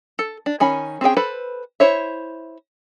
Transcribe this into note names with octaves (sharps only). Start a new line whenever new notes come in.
A4
D4
D#3 C#4 G#5 B5
C4 C#4 G#4 G5
A4 B4 C5 B5
E4 C5 C#5 E5